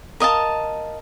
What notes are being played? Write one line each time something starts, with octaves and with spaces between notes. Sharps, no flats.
A#4 D#5 F5 A5